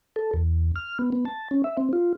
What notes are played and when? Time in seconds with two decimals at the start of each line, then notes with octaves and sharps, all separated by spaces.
0.16 A4
0.34 E2
0.76 F6
0.99 B3
1.12 B3
1.25 A5
1.51 C#4
1.64 E5
1.77 C4
1.93 F4